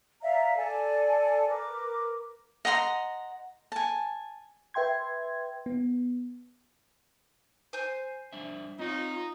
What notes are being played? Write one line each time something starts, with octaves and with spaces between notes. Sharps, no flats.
D5 E5 F5 A#5
A4 D5 G#5 A5
A#4 B4 D6
D#5 F#5 A#5 C6
G#5 A5
B4 E5 G5 C6 G#6
B3
C5 G#5 G6
G3 D4 E5
C4 D#4 F4 C#5